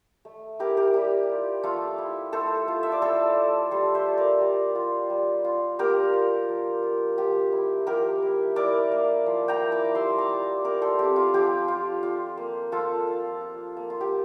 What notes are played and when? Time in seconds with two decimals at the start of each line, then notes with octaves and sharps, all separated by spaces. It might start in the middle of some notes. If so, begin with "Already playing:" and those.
0.25 A3
0.59 E4 G4 A#4
0.77 G4 A#4
0.94 G3 G4
1.29 F4
1.63 A3 F4 A4
1.98 E4
2.33 A3 A4 C5
2.68 F4
2.83 E5
2.92 D5
3.02 E4 A4 C5
3.36 A3
3.71 G3 A4 C5
3.95 C5 E5
4.06 F4
4.18 A#4 D5
4.41 G3
4.75 F4
5.10 G3
5.44 F4
5.79 A#3 G4 A#4
6.13 F4
6.49 F3
6.83 F4
7.18 F3 G4
7.52 E4
7.87 F3 G4 A#4
8.22 E4
8.56 E4 A#4 D5
8.92 A#3
9.26 F3
9.48 G5 A#5
9.61 E4
9.72 A#5 D6
9.95 G3 C6 E6
10.18 A#5 D6
10.29 F4
10.65 E4 A#4 D5
10.82 A4 C5
10.99 C4 G4
11.16 F4
11.34 F3 G4
11.68 F4
12.03 F4
12.37 A#3
12.72 F3 F4 A4
13.07 F4
13.41 F4
13.77 A#3
13.90 F4
14.01 G4